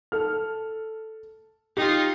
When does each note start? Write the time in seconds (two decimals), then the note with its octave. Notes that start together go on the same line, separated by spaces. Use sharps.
0.12 A4 F6
1.77 D#4 F4 G4